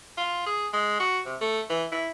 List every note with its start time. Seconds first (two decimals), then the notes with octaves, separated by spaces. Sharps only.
0.18 F4
0.46 G#4
0.73 G#3
1.00 F#4
1.26 C3
1.41 A3
1.70 E3
1.92 E4